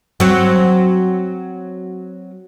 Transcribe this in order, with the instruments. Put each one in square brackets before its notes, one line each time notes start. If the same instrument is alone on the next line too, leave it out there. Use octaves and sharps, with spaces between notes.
[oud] F#3 C4